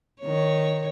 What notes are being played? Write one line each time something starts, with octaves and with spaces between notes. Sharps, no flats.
D#3 C#5